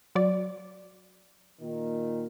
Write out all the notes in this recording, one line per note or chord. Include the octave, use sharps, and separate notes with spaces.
F#3 D5
A#2 D#3